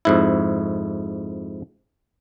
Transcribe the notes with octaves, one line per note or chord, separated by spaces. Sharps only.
F2 G#2 E4